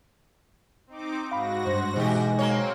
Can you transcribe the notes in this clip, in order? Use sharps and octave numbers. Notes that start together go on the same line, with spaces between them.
C4 D#4 D6
G#2 F#4 F5 B5 A#6
G2 C5
B2 E3 G#3 D#4 G4
F#3 A#3 C4 C#5